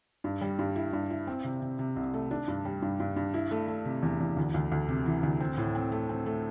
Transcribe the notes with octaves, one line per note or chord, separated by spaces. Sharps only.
G2
G3
G2
E4
G2
E4
C4
C3
C3
C3
C2
A3
D4
G2
G3
G2
G2
G2
E4
A3
A3
C3
E2
E2
D2
D2
D2
C3
E3
D2
C4
A2
C4
A3
C4
A3